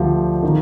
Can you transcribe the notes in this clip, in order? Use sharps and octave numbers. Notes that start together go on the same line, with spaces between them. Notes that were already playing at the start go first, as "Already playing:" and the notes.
Already playing: D2 D3 F3 G4
D#3